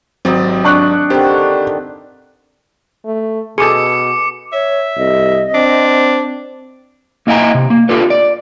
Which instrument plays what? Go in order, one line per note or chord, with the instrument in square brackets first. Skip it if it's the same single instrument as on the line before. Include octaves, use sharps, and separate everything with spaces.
[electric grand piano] G#1 F#3 C4 [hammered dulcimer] G4 D5 D#5
[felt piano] D4 C#6 F#6
[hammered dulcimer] D3 D#3 [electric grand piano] C4 G4 C5
[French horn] A3
[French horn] B2 [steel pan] G#4 A4 [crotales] D6 C#7
[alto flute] C#5 [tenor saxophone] E5
[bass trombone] C2 [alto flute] D#5
[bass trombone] C4 [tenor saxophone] D4
[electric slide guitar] A#3 E4 D#5 G5 G#5 A#5
C3
A#3
D4 F4 G4 A4 B4
D5